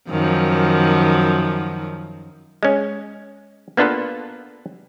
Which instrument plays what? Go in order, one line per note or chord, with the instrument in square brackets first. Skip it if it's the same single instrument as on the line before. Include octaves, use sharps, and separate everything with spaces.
[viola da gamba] F#2 D#3 F3
[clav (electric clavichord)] G#3 C#4
A#3 B3 D4 F4 A4 B4